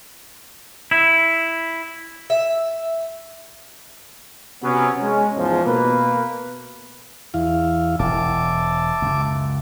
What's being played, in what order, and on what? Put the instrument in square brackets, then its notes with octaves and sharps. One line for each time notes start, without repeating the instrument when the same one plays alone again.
[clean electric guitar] E4
[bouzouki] E5
[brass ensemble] C3 F#3 B3 C#4
G#3 C#4
E2 G#2 F3
B2 A#3 B4
[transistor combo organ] E2 E4 F5
[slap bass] E1 [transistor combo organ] E5 A5 D6
[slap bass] C#2 F#2